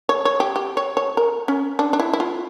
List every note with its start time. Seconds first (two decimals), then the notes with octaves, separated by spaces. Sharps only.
0.09 C#5
0.25 C#5
0.40 G4
0.56 G4
0.77 C#5
0.97 C#5
1.17 A#4
1.48 C#4
1.79 D4
1.93 D4
2.00 E4
2.13 E4
2.20 F4